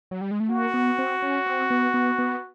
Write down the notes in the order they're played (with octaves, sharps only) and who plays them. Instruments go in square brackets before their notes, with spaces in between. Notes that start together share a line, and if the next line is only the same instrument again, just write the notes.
[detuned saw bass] F#3
G3
G#3
A3
[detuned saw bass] A#3 [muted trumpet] F#4
[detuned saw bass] B3
C4
C#4
C4
B3
B3
B3